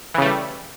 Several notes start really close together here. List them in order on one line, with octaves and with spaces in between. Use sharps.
E3 C#3 A3 G3